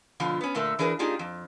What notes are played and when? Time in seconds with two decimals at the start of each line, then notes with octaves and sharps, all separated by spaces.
0.20 B2 D3 F3 F4
0.41 B3 C#4
0.54 A#2 D3 A3 A4 A#4 E5
0.79 E3 D4 G#4 A#4 B4
0.99 A#3 D4 D#4 F4 G4 G#4
1.19 F2